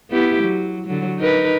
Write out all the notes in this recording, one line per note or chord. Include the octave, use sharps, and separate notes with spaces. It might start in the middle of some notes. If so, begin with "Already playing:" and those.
B3 E4 G4
F#3
D3 F#3
D#4 A#4 B4